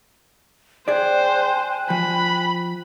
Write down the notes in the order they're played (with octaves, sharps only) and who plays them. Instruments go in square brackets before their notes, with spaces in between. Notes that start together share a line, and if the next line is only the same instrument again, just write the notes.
[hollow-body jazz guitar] G#4 D5 [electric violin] C5 [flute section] G5 G#5 F#6
[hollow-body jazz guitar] F3 [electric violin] B5